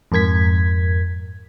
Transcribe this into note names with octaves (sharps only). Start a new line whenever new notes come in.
F2 G#2 A#4 G#6 B6